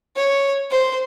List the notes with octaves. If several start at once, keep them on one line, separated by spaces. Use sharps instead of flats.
C#5
C5